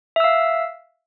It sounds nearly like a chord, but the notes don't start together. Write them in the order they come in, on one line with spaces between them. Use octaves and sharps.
E5 E6 F5